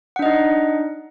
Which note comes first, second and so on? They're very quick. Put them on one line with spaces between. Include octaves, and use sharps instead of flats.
F#5 D4 D#5 D#4